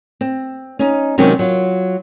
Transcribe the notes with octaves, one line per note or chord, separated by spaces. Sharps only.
C4
C#4 D#4
C3 D#3 F#3 G#3 C4 C#4
F#3 F4